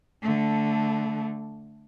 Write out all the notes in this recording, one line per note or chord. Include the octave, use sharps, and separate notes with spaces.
D3 A3